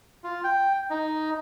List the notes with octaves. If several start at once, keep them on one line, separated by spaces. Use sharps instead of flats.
F4
G5
D#4